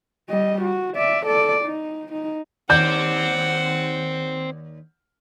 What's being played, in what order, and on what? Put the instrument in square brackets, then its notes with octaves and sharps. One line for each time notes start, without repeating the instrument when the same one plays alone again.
[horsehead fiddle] G3 D#5
F#4
D5 E5
A4 D5
D#4
D#4
[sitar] D#2 D5 [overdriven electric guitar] C4 [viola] F#5 [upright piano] G6